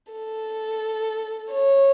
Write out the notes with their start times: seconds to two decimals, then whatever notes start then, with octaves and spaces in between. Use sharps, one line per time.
0.12 A4
1.52 C#5